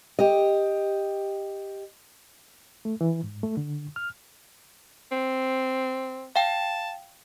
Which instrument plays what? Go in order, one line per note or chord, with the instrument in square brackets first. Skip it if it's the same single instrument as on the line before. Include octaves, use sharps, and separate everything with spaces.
[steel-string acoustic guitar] G4 D#5
[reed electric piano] A3
E3
G#2
A3
D3
F6
[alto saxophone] C4
[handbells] F5 G5 [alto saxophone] A5